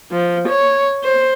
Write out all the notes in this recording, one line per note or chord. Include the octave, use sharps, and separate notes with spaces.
F3
C#5
C5